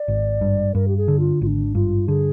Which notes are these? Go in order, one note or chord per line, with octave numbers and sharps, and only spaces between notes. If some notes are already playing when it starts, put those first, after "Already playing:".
Already playing: D5
G#1
G2
G2 A#4
G4
G#4
D3
F4
G#1 F4
D4
G2 F4
D3 G#4